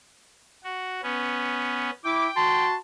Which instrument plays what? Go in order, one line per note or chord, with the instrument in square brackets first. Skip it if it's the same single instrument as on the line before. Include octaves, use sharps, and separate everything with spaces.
[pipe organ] F#4
B3 C#4
[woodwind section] E4 D6 [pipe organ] G5
[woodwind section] F#4 A5 C6